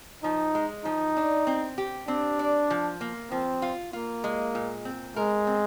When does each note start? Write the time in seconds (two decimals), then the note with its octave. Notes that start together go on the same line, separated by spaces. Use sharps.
0.24 F3 D#4
0.55 G#3
0.85 F3 D#4
1.17 D4
1.47 C4
1.78 G4
2.08 C4 D4
2.39 D5
2.70 F3
3.01 A#3
3.31 F3 C4
3.62 F4
3.93 A#3 F4
4.24 G#3
4.55 A#2
4.85 C4
5.16 G#3 A#4
5.47 C4